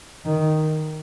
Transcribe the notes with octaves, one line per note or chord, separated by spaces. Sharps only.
D#3